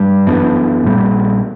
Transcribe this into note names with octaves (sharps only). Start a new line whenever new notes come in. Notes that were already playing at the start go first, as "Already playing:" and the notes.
Already playing: G2 G3
F#2 E3 B3 D4
A#1 A#2 G3